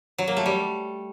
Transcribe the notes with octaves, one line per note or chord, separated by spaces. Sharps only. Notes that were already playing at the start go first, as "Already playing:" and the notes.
F#3
A#3
A3
G3